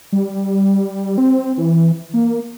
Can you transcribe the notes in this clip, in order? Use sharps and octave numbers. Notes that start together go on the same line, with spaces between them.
G3
C4
E3
A#3